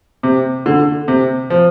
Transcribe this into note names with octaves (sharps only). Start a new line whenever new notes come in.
C3
D3
C3
F3